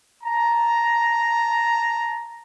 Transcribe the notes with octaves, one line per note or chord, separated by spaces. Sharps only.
A5 A#5